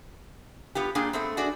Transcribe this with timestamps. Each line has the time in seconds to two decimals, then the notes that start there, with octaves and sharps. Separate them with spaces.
0.75 B3 F4 G4
0.95 A#2 A#3 D4 G#4 F5 G5
1.13 A3 B3 C4
1.37 D4 F#4 G#4 D5